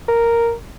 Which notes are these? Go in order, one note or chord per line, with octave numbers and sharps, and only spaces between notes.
A#4